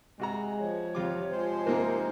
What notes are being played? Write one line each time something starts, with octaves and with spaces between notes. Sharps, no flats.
C3 G#3 F#4 A#5
F3 C#5
F2 C3 F4 G4 D6
F3 G#3 C5
C3 A#3 D#4 A#4